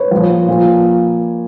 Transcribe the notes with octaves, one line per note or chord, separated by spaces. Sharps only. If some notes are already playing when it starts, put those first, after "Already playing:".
Already playing: B4 C#5
A#2 F3
A#2 F3